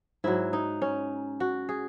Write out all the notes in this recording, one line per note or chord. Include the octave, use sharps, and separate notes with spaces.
G#2 F#3 E4
D#4
C#4
F#4
G#4